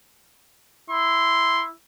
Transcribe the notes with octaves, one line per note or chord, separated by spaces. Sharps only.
E4 C6